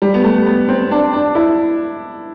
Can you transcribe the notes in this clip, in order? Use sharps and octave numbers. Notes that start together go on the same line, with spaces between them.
G3
B3
A3
B3
C4
D4
D4
E4